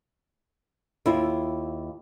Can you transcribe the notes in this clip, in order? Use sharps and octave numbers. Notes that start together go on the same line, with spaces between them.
D#2 E4 F4